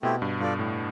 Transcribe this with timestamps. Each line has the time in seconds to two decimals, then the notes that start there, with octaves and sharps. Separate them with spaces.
0.02 B2 A3 C4 E4 G4
0.22 G2
0.40 G2 F4 A4 D5
0.59 A2